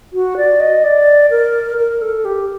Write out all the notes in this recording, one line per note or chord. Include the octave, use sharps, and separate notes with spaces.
F#4
D5
D#5
D5
A#4
A#4
A4
G4